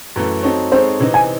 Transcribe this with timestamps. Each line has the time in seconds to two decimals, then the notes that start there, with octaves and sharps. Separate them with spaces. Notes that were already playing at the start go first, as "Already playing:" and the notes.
0.16 F#2 E3 A3
0.43 F#3 C4 D#4 A4 C#5
0.72 G#3 C4 D#4 A4 C5 C#5
1.00 C3 E3 C4 D#4
1.14 G#5